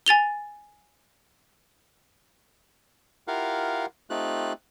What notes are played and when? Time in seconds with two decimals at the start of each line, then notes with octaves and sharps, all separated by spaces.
0.06 G#5 A6 F7 G7
3.28 E4 F4 G4 A#4 F5 F#5
4.10 A3 C4 D#4 F4 G4 F#6